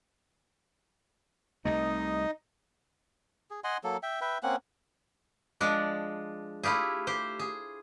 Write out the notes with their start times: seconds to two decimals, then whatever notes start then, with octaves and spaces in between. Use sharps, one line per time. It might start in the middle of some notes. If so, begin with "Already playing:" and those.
1.65 C2 C3 A3 D#4 D#5
3.51 G#4
3.64 D#5 F#5 G#5 C6
3.84 F#3 A#3 A4
4.03 E5 G5
4.21 B4 E5 G5
4.43 A#3 C4 C#4 F#5
5.61 F3 G#3 D4 D5
6.63 A3 E4 F4 G4 G#4
7.07 G4 C5
7.39 G#4